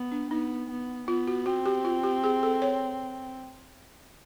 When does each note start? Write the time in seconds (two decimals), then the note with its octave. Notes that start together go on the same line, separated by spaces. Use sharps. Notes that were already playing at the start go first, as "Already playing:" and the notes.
Already playing: B3
0.12 D4
0.31 B3 D#4
0.70 B3
1.08 B3 F4
1.28 F#4
1.46 C4 F#4
1.66 G4
1.85 F4
2.03 G4
2.24 G#4
2.43 A4
2.62 C#5